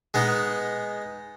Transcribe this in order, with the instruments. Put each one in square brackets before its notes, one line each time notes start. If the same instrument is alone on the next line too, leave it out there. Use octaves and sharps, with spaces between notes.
[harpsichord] G#3 B3 D#4